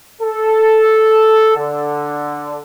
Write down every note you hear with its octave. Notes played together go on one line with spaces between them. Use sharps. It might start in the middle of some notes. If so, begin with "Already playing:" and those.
A4
D3